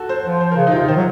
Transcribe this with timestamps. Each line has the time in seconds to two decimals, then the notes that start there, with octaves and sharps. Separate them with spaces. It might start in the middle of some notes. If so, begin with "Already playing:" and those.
Already playing: F#4 A4
0.09 C5
0.25 F3
0.41 C5
0.51 A#4
0.56 C#3 C5
0.67 D#4
0.72 C3 F4
0.88 D#3 C5
0.96 F#3